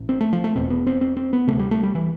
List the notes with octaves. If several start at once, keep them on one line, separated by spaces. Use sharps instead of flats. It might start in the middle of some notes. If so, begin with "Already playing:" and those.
Already playing: A1 A2
C4
A3
F3
A3
E1 E2 B2 C4
B3
C4
C4
C4
B3
D2 C3 A3
G3
A3
G3
E3